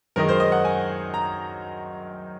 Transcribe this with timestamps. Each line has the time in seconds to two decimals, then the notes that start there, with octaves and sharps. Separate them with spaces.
0.16 F#2 D#3 G#3 D#4 A#4
0.29 C5
0.40 D#5
0.52 F#5
0.65 G#5
1.14 A#5